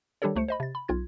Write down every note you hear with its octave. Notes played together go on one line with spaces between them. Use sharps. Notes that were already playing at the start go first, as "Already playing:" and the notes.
D#3 G3 D4 G4 A4 C#5
C#2 A3 C5 C#7
C5 D#5 B5
C3 A6
B5
B1 F4 G#6